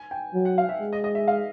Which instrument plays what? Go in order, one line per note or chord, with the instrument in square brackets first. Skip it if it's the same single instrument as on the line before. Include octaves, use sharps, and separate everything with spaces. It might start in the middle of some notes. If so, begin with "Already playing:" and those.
Already playing: [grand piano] G#5
G5
[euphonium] F#3
[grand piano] F#5
F5
E5
[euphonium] G#3
[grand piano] D#5
D#5
E5
F5